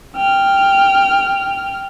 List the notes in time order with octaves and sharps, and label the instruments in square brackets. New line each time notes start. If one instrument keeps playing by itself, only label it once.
[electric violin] G5 F6